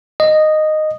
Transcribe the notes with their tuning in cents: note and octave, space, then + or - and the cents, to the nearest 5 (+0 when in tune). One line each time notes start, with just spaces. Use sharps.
D#5 -10